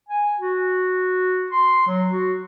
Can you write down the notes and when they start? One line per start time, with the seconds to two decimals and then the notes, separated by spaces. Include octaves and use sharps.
0.09 G#5
0.39 F#4
1.51 C6
1.87 F#3
2.10 F#4